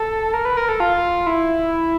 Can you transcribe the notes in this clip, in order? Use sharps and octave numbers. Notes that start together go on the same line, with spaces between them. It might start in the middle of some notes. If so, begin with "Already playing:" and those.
Already playing: A4
A#4
B4
A#4
A4
F4
E4